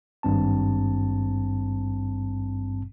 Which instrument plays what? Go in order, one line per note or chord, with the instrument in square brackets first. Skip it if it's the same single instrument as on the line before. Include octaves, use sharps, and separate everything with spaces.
[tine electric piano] G#1 G2 C4 A5